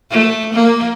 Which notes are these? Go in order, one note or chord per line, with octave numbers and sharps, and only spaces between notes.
A3
A#3